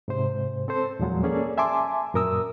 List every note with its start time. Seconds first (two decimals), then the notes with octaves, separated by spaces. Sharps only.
0.08 G#2 C3 C5
0.68 C4 A4 C5
0.99 E2 A#2 F3 F#3 G#3
1.23 A#3 C#4 G#4 A4 D5
1.58 E5 G#5 A5 C6 D6
2.14 F#2 A#2 A#4 D#6 E6